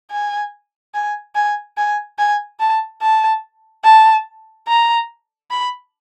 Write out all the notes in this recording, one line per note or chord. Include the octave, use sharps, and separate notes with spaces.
G#5
G#5
G#5
G#5
G#5
A5
A5
A5
A#5
B5